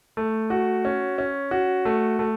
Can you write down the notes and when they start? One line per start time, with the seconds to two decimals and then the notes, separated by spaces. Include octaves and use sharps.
0.17 A3
0.50 F#4
0.85 C#4
1.18 C#4
1.51 F#4
1.85 A3
2.19 A3